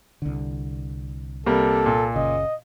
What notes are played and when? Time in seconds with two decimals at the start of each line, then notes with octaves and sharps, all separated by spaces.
0.22 C2 D3
1.46 C3 G3 A#3 A4
1.86 A#2
2.16 F#1 C#3 D#5